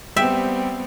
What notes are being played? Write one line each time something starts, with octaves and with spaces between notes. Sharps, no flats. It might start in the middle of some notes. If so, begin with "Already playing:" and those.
G3 B3 C4 E5 G5